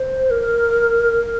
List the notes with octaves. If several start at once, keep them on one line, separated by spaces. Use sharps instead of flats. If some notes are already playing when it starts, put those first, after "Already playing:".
Already playing: C5
A#4